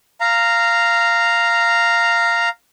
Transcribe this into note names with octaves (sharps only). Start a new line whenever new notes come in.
F5 A#5